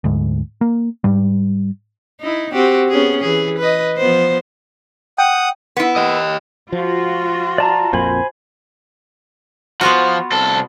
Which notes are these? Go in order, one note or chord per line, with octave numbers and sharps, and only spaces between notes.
D2 G#2
A#3
G#2 G3
D#4 E4
C4 F#4 G4
B3 C#4 G#4
E3 G#4
B4 D#5
F3 B3 C5
F#5 G5 D#6
B3 E4
G4 D#5
F3 F4 F#4
D5 A5 A#5
A#1 F2 A#3 C5 G#5 B5
F3 B3 F4 F#4
C2 A4